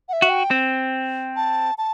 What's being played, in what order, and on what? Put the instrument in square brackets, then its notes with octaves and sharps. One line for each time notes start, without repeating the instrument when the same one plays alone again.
[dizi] F#5
E5
[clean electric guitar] F#4
[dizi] G5
[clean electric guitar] C4
[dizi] A5
A5